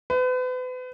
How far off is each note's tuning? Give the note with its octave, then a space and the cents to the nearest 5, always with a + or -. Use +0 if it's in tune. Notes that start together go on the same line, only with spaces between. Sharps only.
B4 +40